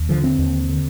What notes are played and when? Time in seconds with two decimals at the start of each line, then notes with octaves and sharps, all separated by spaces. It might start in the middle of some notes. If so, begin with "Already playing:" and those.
Already playing: D#2
0.09 D3 F3
0.24 C4
0.39 D#2
0.69 D3